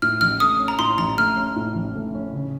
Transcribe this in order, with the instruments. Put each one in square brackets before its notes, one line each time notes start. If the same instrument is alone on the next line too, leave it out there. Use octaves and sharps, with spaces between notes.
[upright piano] A2 [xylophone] F6
[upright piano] A1 [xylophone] F6
[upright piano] A3 [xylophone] D#6
[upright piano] C#4
[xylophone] A#5
[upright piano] A2 [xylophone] C6
[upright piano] A1 [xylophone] A#5
[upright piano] A3 [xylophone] F6
[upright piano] C#4
A2
A1
A3
C#4
C#3